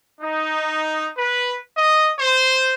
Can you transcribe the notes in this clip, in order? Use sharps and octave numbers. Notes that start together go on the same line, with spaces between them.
D#4
B4
D#5
C5